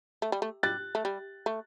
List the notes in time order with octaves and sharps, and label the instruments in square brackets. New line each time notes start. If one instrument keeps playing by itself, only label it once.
[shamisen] A3
G3
A3
[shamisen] G3 [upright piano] F#6 A6
[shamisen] A3
G3
A3